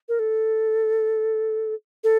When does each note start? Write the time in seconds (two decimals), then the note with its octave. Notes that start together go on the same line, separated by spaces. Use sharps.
0.09 A#4
0.19 A4
2.04 A4